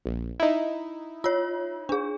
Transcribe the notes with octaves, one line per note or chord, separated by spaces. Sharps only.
A#1
D#4 E4
F4 C#5
D4 G#4